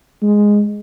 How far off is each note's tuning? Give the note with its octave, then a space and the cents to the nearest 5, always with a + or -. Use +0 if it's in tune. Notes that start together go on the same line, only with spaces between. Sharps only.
G#3 -5